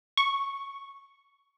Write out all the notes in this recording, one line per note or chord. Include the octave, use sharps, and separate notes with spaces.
C#6